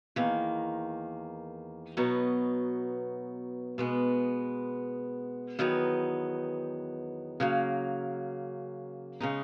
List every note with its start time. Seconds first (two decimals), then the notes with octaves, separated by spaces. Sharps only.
0.16 E2 D#3 A#3
1.97 B2 F#3 B3 D#4
3.78 B2 G#3 B3
5.59 E2 D#3 F#3 B3 D#4
7.40 C#3 F#3 A#3
9.20 C#3 G#3 D#4